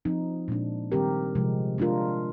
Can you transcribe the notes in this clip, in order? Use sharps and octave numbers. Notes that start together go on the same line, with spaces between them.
F3 C4 D#4
A#2 G#3 D4
D#3 G3 C4 G4 A#4
C3 F3 G#3
G#3 D4 F4 A#4